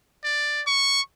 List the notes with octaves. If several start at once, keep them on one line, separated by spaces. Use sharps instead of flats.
D5
C#6